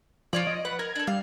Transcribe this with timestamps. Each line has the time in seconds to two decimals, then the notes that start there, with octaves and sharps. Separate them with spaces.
0.33 F3 F4 C#5 D5
0.47 D#5
0.65 B4 F#5
0.79 A#4 G#6
0.95 D4 A4
1.07 G3 F5